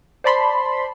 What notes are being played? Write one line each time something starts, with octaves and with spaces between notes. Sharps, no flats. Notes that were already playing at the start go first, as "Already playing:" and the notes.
C5 D5 A5 B5 C6